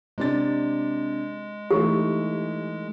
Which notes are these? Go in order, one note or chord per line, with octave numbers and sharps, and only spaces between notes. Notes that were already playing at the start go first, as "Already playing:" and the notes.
C3 G#3 D4 A6
E3 A3 D#4 G4